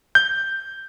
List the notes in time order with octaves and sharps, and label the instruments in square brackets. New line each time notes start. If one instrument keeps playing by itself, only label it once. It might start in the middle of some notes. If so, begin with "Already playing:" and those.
[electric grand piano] G6